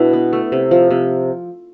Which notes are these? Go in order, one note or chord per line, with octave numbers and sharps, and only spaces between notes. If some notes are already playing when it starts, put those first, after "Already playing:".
Already playing: B2 D4 E4
B3
A3
C3
F3
C3